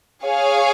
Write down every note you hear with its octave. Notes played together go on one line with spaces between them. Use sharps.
G#4 C#5 F5 G#5